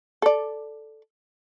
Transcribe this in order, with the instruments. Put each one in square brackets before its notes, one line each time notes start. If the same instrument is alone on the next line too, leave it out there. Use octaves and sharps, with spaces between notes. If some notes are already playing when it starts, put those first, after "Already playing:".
[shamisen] A4 D5